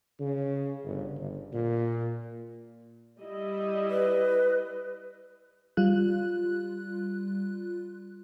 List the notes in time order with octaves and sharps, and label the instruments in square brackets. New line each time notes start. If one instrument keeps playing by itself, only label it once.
[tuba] C#3
G1
G1
A#2
[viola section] G3 E4 D#5
[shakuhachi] B4
[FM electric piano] G3 F4 F#6